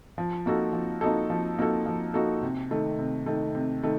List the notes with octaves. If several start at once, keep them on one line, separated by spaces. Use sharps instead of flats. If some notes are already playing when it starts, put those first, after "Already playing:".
F3
A#3 D#4 F#4 A4
F3
A#3 D#4 F#4 A4
F3
A#3 D#4 F#4 A4
F3
A#3 D#4 F#4 A4
C3
D#3 A3
C3
D#3 A3
C3
D#3 A3